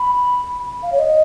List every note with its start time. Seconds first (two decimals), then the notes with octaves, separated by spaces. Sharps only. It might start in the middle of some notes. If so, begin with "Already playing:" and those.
Already playing: B5
0.83 F5
0.92 C#5
0.99 D#5